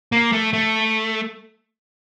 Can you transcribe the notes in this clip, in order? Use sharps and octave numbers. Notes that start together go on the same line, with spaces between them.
A#3
A3
A3